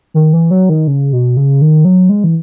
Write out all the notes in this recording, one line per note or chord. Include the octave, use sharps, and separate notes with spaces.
D#3
E3
F#3
D#3
C#3
B2
C#3
D#3
F#3
G#3
E3